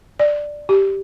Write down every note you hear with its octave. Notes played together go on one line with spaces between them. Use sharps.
D5
G4